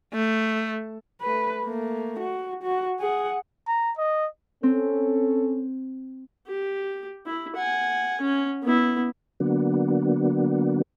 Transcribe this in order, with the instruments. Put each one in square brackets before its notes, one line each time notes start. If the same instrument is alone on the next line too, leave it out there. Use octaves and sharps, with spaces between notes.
[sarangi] A3
[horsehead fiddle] A3 B4
A3 A#3
F#4
F#4
G#4 F#5
[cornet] A#5
D#5
[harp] C4 [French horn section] C#4 A4
[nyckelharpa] G4
E4
F#5 G#5
C#4
B3 E4
[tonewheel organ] D3 F#3 A#3 B3 D4 F#4